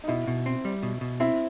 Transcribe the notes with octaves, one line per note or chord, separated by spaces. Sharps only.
D#4
B2 E4
B2
C4
G3
B2
B2
C4 E4